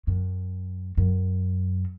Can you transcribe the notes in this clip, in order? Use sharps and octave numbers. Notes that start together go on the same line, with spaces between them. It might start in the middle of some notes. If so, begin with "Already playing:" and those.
F#2
F#2